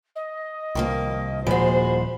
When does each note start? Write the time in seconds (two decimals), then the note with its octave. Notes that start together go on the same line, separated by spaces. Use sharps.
0.15 D#5
0.75 C2 D#3 F3 A#3
1.47 D#1 A#2 F3 G#3 F#4 C5 B5